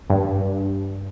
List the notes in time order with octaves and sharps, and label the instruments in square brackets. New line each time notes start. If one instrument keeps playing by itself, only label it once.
[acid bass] G2